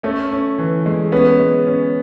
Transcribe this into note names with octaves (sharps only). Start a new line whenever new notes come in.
A3 C#4
C#4
E3
G#3
B3 C#4
G#3
C#4